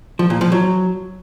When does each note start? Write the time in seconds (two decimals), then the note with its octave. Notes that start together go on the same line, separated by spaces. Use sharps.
0.19 F3
0.30 A#2
0.41 F3
0.52 F#3